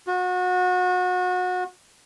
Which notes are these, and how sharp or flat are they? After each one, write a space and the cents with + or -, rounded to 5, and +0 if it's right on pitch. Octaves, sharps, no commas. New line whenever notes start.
F#4 -30